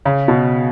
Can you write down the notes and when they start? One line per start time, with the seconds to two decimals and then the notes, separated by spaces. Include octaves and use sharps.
0.06 C#3
0.28 B2